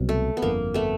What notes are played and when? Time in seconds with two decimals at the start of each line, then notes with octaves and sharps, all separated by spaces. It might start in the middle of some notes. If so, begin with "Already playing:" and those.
Already playing: C2 B2 F#3
0.09 A3
0.37 B3
0.42 G1 F2 D3 A#3
0.74 A3 B3